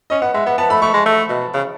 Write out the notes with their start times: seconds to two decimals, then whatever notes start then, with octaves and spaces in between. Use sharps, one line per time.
0.10 C#4 D#5
0.22 B3 F#5
0.34 G#3 E5
0.46 B3 F#5
0.58 B3 A5
0.70 A3 B5
0.82 A3 C#6
0.94 G#3
1.06 A3
1.30 B2
1.54 C#3